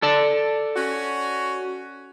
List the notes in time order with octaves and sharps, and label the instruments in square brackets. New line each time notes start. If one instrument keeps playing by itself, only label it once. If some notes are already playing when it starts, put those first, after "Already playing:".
[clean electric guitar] A4 D5 A5
[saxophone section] C#4 F#4